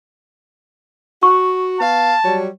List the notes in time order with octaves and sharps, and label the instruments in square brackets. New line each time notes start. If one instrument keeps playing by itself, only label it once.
[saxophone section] F#4 [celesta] C#6
[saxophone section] B3 F5 [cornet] A5
[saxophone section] F#3 G3 C#5